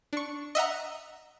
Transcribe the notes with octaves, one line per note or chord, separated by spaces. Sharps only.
D4 C#6
D#5 E5 F#5 A#5